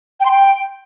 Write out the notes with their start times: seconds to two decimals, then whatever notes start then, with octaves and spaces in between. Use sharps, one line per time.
0.20 G5
0.25 C6
0.31 G5